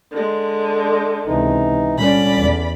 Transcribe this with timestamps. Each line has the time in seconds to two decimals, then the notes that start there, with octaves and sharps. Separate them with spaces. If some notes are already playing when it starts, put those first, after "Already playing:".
0.11 D3 G#3
1.27 C#2 C3 E3 D#4
1.98 A#2 D3 G3 C#4 D5 B5
2.37 E2